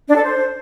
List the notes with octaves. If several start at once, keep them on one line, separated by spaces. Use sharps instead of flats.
D4
A4
C5